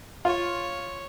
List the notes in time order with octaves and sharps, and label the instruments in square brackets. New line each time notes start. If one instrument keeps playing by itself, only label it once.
[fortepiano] F4 [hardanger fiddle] C#5